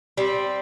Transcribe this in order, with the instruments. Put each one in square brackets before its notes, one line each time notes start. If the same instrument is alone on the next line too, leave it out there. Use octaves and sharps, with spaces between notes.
[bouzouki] G3 C4